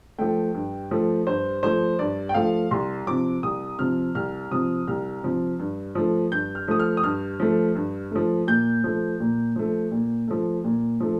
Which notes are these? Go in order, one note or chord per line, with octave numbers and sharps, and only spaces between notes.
F3 A3 G5
G2
F3 A3
G2 C5
F3 A3 C5
G2 D5
G5
F3 A3 F5
C2 C6
C3 F3 D6
C2 D#6
C3 F3 F6
C2 F6
C3 F3 D#6
C2 F6
C3 F3
G2
F3 A3
G2 G6
F6
F3 A3 D#6
F6
D#6
G2 F6
F3 A3
G2
F3 A3
A#2 G6
F3 A3
A#2
F3 A3
A#2
F3 A3
A#2
F3 A3